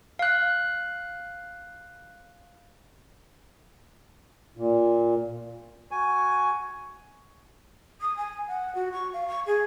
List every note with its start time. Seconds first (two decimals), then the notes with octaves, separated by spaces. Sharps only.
0.19 F5 F#6
4.57 A#2
5.91 F#4 G#5
8.01 D#6
8.17 G#5
8.48 F#5
8.75 F#4
8.92 C#6
9.13 F5
9.28 C#6
9.46 G#4